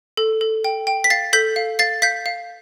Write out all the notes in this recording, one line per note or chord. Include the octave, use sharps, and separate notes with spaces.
A4
A4
G5
G5
B6
F5 A6 C7
A4 G6 B6
F5
F5 A6 C7
F5 G6 B6
F5